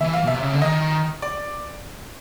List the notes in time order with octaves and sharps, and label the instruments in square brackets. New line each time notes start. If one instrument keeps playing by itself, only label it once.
[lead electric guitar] E3 [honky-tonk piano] E5
[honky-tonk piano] F5
[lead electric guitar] B2
[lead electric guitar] C3 [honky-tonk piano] E5
[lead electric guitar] C#3
D3
[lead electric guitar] D#3 [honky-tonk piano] D#5
[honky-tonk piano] D5